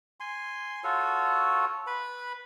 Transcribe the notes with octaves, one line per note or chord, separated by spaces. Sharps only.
G#5 C6
F4 F#4 A4 C#5
B4 B5